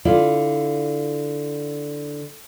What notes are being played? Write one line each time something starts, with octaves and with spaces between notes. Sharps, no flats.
D3 E4 F4 D5